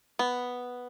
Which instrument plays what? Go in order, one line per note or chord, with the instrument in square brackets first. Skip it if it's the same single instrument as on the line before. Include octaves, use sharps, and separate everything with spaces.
[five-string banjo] B3